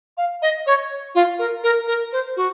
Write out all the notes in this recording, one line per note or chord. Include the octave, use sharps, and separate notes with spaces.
F5
D#5
C#5
F4
A#4
A#4
A#4
C5
F#4